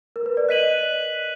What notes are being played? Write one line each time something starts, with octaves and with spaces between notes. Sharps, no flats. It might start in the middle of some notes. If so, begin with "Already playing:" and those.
A#4
B4
D5
D#5 F#6 B6 D#7 F#7